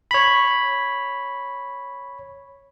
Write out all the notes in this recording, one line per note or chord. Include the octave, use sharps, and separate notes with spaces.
C#5 B5